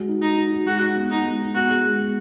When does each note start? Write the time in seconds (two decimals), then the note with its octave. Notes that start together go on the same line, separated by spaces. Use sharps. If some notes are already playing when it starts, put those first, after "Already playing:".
Already playing: G#3 F#4
0.08 D#4
0.22 D#4 F#4
0.37 D#4
0.52 F#4
0.66 G#3 F#4
0.82 D#4
0.96 B3
1.11 B3 D#4
1.25 G#3
1.41 D#4
1.55 B3 F#4
1.70 G#4
1.85 G#3
2.00 B3